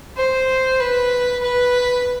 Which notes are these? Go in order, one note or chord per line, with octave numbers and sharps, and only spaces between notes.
C5
B4
B4